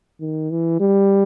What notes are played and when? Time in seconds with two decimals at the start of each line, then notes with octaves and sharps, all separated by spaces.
0.21 D#3
0.51 E3
0.80 G3